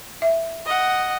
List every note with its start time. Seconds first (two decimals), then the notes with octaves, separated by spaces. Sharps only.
0.22 E5
0.66 D#5 F#5